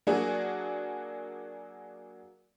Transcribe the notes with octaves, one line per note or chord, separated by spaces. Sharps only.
F#3 A#3 D4 F#4 G#4